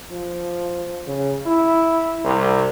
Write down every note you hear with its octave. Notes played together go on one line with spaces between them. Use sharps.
F3
C#3
E4
C2